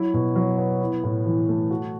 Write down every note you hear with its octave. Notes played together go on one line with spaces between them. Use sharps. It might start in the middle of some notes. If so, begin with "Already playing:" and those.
Already playing: F#3 E4
B2
F#3
B3
E4
A2
E3
A3
F#4